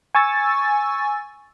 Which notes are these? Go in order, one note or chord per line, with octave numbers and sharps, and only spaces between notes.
G#5 C#6 E6 A6